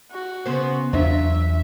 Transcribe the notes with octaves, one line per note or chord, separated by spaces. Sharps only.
F#4
C#3 B3 C5
E2 F#3 D4 F4 C5 E5